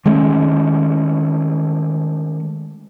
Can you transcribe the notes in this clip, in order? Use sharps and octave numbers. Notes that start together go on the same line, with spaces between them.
D#3 G#3 A3 C#4